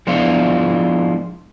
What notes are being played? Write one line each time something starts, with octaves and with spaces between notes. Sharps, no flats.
F3 G#3 B3 D4 E4 F4